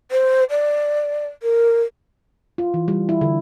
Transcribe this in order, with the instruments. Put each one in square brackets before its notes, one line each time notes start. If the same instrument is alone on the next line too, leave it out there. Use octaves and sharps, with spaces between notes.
[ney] C5
D5
A#4
[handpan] F4
E3
G3
E4
D3